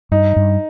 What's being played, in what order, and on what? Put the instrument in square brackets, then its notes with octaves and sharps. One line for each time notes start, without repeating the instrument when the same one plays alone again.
[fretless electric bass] G2 [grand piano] D#4
[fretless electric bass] G2